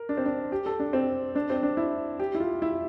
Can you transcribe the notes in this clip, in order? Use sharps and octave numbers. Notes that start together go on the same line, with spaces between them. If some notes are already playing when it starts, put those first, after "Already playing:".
Already playing: A#4
D4
C4
D4
G4
A4
D4
C4
D4
C4
D4
E4
G4
E4
F4
E4